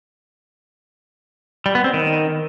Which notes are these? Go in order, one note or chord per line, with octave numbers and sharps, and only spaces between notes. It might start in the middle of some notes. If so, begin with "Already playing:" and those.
G3
B3
C4
D#3